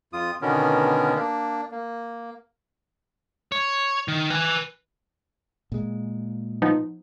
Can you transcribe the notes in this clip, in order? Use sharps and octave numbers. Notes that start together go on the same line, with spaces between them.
F2 F4 D#6
B2 D3 D#3 B3 C#4 A#4
A#3 D4
A#3
C#5
D#3
B4 G#5
A#2 G#3
F3 B3 D#4